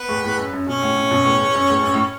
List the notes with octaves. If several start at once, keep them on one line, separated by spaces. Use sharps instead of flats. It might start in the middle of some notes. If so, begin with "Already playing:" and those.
Already playing: B3 B4
E2 A2
E2 A2
F#2
F#2
F#2 B2 C#4 C#5
A2 C#3
A2 C#3
F#2 B2
E2 A2
E2
F#2
E2 A2
F#2
A2